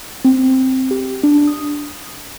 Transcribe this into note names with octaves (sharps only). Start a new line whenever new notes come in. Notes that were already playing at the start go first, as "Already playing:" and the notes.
C4
G4
D4
D#6